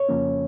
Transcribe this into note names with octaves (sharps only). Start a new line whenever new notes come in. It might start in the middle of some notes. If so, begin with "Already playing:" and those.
Already playing: C#5
F2 C#3 F3 A#3 C#4